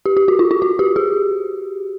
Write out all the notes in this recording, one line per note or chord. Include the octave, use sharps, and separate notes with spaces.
G4
G4
F#4
F4
F4
F#4
G4
G#4